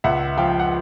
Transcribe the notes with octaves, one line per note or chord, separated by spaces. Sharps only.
C#2 E5 F#5
F3 F5 G5
F#5